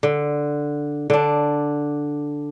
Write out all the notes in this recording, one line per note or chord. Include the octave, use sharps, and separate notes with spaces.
D3
D3 D4